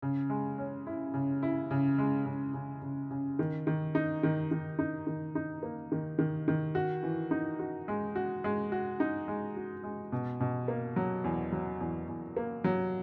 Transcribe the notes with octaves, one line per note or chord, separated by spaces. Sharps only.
C#3
G#3
C#4
E4
C#3
E4
C#3
G#3
C#3
C#3
C#3
C#3
D#3
D#3
D#4
D#3
D#3
D#4
D#3
D#4
A#3
D#3
D#3
D#3
F#4
E3
D#4
F#4
G#3
F#4
G#3
F#4
D#4
G#3
F#4
G#3
B2
B2
A#3
F#3
E2
F#3
E2
E2
A#3
F#3